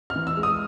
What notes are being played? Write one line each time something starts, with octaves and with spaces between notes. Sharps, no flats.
F6
E3
E6
G#3
D#6